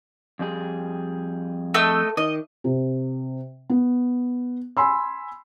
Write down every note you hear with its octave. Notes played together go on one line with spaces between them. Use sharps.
F2 G3 G#4
A3 D#5 E6
D#3 D#5
C3
B3
G#5 B5 C6 E6